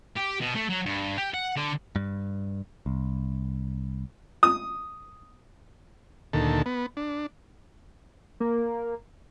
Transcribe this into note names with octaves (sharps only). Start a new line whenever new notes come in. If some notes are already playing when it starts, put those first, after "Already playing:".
G4
B2
A3
F#3
G2
G4
F#5
D3
G2
C2
D#6
D2 A#2 D#3 A4
B3
D4
A#3